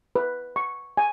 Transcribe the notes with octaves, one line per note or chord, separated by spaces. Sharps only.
B4
C#6
G#5